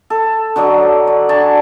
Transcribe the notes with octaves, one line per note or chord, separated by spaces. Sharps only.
A4
D3 F#3 D#5 D6
D5
D4 F#4 G#5 A5